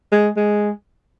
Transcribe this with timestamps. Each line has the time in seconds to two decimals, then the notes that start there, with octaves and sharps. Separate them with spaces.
0.12 G#3
0.36 G#3